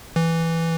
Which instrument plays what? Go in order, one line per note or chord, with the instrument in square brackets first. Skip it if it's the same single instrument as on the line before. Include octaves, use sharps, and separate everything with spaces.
[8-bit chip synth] E3